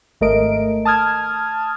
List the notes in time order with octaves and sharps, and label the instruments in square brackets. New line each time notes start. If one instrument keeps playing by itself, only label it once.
[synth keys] G#1 A3 A#4 D#5 D7
A5 D#6 F6 G#6